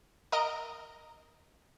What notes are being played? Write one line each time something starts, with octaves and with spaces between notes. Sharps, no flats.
A#4 D#5 D7